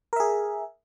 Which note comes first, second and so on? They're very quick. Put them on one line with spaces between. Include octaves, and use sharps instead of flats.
A#4 E5 G#4